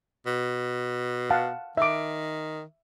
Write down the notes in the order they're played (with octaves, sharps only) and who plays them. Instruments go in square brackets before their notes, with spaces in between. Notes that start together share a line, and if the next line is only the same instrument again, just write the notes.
[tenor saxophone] B2
[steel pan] F5 F#5 A5
[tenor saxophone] D#3 [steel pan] E5 D6